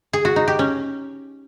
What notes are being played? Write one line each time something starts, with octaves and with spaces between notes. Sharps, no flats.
G#4
F#4
D#4
G4
C#4